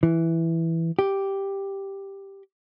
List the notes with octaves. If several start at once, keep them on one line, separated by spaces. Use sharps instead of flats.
E3
G4